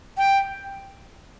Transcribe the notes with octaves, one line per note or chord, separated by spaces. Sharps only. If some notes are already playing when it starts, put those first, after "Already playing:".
G5